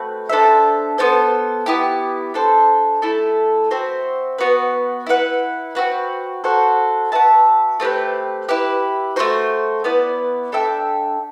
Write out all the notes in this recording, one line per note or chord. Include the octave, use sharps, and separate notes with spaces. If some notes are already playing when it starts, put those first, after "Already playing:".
Already playing: A3 C4 F#4 B4
D4 A4 C5 E5
B3 D4 A4 C5
B3 E4 G4
D4 A4 C5
A3 E4 A4
C4 F#4 C5 E5
B3 F#4 B4
E4 B4 F#5
C4 F#4 B4
F#4 A4 C5 F#5
F#4 B4 E5 A5
A3 C4 G4 B4
E4 G4 B4
A3 D4 F#4 C5
B3 E4 B4 D5
D4 A4 E5 G5